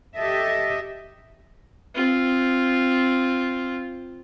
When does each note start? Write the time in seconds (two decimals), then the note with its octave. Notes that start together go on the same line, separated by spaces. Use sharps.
0.15 G4 A4 D#5 E5
1.95 C4 F4